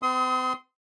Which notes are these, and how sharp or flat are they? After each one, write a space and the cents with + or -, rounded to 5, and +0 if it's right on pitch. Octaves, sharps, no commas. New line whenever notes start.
C4 -45 C6 -15 D#6 +35